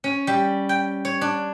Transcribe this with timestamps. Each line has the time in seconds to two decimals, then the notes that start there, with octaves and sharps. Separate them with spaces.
0.04 C#4
0.27 G3
0.69 G5
1.05 C#5
1.21 D4